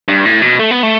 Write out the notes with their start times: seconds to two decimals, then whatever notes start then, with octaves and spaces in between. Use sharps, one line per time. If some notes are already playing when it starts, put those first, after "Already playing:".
0.08 G2
0.25 A2
0.42 B2
0.59 A3
0.71 B3
0.83 A3